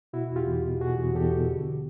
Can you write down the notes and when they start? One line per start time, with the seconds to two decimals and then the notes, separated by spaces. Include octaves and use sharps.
0.13 B2 E4 F#4
0.30 E2
0.36 F4 G4
0.47 E2
0.65 B2
0.81 B2 F#4 G#4
0.98 E2
1.15 E2 G4 A4
1.33 B2
1.50 D3